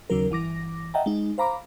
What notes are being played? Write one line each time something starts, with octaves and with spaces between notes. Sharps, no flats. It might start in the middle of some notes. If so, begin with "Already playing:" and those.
D#2 C#3 F#3 A#4
G1 E3 D6 A#6
D#5 E5 F#5 G5 A5 A#5
G#3 D#4
C5 F5 A#5 B5 D6